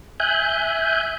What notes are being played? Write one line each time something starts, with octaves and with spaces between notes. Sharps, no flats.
E5 G#5 F#6 G6